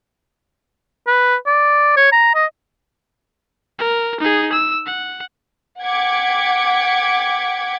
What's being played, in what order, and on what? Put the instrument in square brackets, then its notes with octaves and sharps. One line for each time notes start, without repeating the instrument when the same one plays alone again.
[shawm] B4
D5
C#5
A#5
D#5
[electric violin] A#4
D#4 G#4
E6
F#5
[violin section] F#5 G5 D6 G#6 B6 C#7